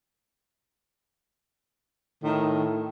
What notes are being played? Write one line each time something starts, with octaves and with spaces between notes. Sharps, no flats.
A2 D#3